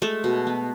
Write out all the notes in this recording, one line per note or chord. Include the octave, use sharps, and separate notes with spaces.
G#3 A3 A4
B2
B3